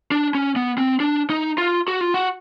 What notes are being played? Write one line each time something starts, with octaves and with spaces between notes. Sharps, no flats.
D4
C#4
B3
C4
D4
D#4
F4
F#4
F4
F#4